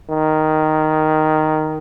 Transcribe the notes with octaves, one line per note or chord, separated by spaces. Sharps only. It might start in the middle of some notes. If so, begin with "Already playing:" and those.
D#3